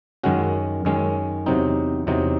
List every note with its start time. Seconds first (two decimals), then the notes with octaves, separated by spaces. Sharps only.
0.23 F#2 D#3 G#3 C#4 F#4
0.85 F#2 D#3 G#3 C#4
1.46 E2 C3 F#3 C4 D#4
2.07 E2 C3 F#3 C4 D#4